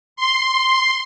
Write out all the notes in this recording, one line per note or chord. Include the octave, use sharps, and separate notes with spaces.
C6